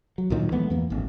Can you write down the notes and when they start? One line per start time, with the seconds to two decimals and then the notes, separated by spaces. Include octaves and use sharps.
0.18 F#3
0.30 D2 A#2 D#3 F#3
0.52 E3 G#3 A3 B3
0.70 E2 E3 A#3
0.90 D1 G#1